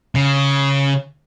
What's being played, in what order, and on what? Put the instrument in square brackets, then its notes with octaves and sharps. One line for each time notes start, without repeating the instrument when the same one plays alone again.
[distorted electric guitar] C#3